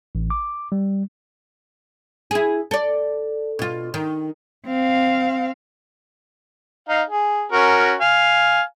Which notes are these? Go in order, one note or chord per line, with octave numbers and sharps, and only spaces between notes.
A1
D6
G3
E4 G#4
A4 D5
B2 F4
D#3
C4 F5
D#4 F5
G#4
C#4 F#4 A#4
F5 G#5